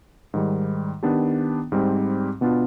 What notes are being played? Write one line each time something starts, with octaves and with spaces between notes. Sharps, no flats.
G#2 D#3 G3
D#3 B3 D4 G4
G#2 G3 C4 G4
B2 B3 D4 F4